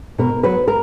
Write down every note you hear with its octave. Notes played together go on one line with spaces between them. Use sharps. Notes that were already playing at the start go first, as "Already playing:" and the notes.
B2 A#4
F#3 B4
A#4